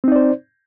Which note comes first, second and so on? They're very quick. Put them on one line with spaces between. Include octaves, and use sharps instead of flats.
C4 D#4 D5 C5